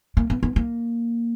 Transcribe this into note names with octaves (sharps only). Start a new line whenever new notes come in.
A#3
B3
B3
A#3